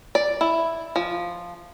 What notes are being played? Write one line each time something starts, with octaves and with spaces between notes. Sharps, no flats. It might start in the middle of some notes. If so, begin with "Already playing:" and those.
D5
E4
F3